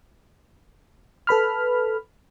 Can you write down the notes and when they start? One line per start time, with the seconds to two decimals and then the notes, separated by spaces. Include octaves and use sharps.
1.27 A4 B4 B5 F6